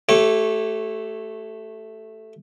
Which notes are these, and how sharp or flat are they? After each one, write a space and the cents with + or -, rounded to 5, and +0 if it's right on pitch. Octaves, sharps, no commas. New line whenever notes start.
A3 +0 G4 -30 C#5 -25